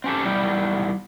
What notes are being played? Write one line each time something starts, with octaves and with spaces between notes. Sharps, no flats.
C4 C#4 G4 A4
E2 G3 E4 G5